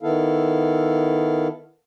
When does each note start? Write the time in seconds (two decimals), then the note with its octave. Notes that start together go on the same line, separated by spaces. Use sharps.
0.02 D#3 B3 E4 A4 F5